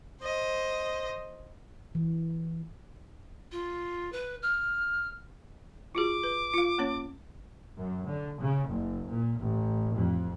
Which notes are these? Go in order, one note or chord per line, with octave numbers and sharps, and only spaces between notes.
C5 D#5
E3
F4
B4
F6
F4 F#4 G#4 D6
B4
F4 F5
A#3 C#4 C#5
F#2
D3
C#3
F#1
A#2
A1
F2